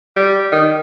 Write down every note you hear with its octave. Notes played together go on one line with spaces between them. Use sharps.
G3
D#3